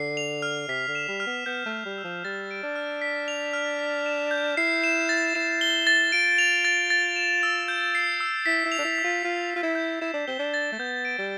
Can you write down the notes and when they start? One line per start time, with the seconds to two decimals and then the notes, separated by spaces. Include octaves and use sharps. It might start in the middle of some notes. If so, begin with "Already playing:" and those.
Already playing: D3 C7
0.17 F7
0.42 F6
0.68 C3 B6
0.88 D3
0.95 E7
1.08 G3
1.20 F6
1.27 B3
1.46 B3 G6
1.66 A3
1.72 B6
1.86 G3
1.98 E6
2.04 F3
2.25 G3 A6
2.51 D7
2.63 D4
2.76 F6
3.02 B6
3.28 F7
3.53 F6
3.79 B6
4.06 E7
4.31 G6
4.57 E4 C7
4.84 E7
5.09 A6
5.35 E4 E7
5.61 G7
5.87 A6
6.12 F4 D7
6.38 F7
6.65 A6
6.90 A6
7.16 E7
7.43 E6
7.68 G6
7.95 C7
8.20 E6
8.46 E4 B6
8.66 E4
8.72 F7
8.79 D4
8.85 E4
8.98 E6
9.04 F4
9.23 F4 C7
9.50 F7
9.56 F4
9.63 E4
9.75 G6
10.01 E4 E7
10.14 D4
10.28 C4 G7
10.39 D4
10.54 A6
10.72 A3
10.79 B3 G6
11.05 D7
11.19 G3